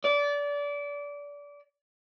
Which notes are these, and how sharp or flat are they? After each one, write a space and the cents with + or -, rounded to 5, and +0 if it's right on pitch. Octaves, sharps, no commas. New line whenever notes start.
D5 -25